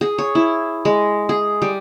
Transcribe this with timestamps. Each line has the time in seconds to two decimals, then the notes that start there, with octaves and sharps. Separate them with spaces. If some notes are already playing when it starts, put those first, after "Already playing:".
0.01 G#4
0.18 C#5
0.35 E4
0.85 G#3
1.29 G#4
1.62 G3